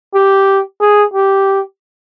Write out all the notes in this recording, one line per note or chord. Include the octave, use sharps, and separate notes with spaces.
G4
G#4
G4